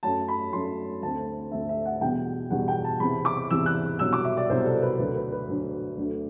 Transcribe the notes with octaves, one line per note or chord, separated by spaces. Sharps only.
F#2 F#3 A3 A5
B5
F#2 F#3 A3 C6
D2 D3 A3 C4 A5
D2 D3 A3 C4 E5
E5
F#5
E2 B2 G3 B3 G5
E2 B2 G3 B3 F#5
G5
A5
E2 C3 E3 B5
D6
E2 C3 E3 E6
F#6
C2 B2 F#3 E6
D6
E5
D5
C2 B2 F#3 C5
A4
B4
D2 D3 F#3 B4
B4
B4
D2 D3 F#3
D2 D3 F#3 A3